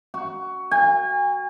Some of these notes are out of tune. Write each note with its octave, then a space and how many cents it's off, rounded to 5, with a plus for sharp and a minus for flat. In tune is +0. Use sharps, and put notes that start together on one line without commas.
F#4 +10
G#5 -40